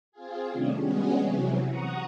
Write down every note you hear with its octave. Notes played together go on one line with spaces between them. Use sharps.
C4 F4 G#4
C3 D#3 G3 A3 C#4 D4
G3 G#3 B3 C#4 F#4 G#4
C3 E3 F#3
F#5 A#5 C#6 D#6